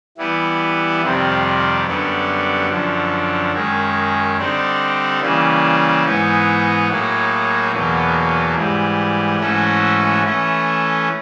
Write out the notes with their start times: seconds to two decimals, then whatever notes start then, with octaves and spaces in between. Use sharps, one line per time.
0.17 E3 G3 B3 E4
1.02 F2 C3 D#3 G3
1.86 F#2 D3 G3 B3
2.69 F#2 D3 F3
3.53 F#2 D#3 G#3
4.37 D3 G3 C4 D#4
5.21 C#3 E3 G3 A#3
6.04 G#2 E3 G#3 B3 D#4
6.88 A2 F#3 A#3 D#4 G#4
7.72 E2 B2 F#3 A#3
8.55 G#2 E3 G3
9.40 G#2 E3 A3 C#4 F#4
10.24 E3 A3 C#4